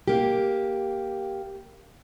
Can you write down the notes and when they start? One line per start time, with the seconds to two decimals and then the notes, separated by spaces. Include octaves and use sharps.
0.08 A#3 G4